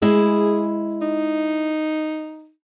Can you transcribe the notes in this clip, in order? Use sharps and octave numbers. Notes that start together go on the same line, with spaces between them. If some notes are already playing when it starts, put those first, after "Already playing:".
G#3 E4 G#4
D#4